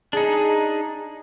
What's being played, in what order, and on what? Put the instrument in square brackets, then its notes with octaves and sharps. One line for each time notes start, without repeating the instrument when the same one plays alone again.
[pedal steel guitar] D4 D#4 [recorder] G#4